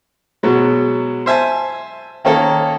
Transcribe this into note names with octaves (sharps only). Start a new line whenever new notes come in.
B2 F#3 G#3
C5 E5 G#5 A5
D#3 A#3 C#4 A4 A#5